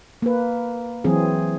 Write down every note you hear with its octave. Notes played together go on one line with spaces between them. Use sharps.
A#3 B4
E3 F#3 C4 G#4